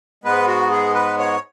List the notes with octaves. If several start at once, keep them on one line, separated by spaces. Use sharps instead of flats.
G#2 G#3 B3 B4
F#4
G#4
B4
C#5